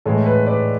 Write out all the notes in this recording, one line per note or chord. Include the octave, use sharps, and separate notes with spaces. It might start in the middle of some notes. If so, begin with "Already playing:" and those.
A2 E3 G#3 A4
B4
B4 D5